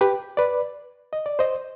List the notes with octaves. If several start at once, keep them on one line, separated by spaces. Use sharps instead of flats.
G4 B4
B4 D5
D#5
D5
C5 D#5